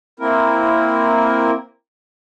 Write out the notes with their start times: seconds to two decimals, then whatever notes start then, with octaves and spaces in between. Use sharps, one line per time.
0.20 A#3 C4 E4 A#4